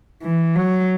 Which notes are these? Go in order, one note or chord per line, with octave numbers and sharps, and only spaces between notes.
E3
F#3